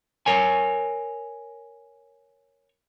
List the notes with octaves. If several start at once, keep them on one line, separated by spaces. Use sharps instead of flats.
A#4 C#5 G#5